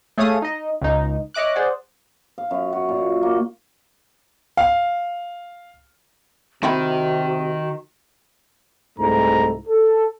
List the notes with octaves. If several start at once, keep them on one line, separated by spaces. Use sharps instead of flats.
A3 G#4 C#5 F5 D#6 D#7
D#4 D#5
C#2 D#4
C#5 D#5 E5 D6 F#6
G#4 C5 D5 F#5
F5
F#2
F#4
A#2
A#3
F5
C3 D#3 C4 E4 F#4 G5
C2 G#2 A3 A#5
A4